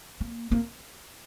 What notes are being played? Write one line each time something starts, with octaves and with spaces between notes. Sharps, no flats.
A#3
A#3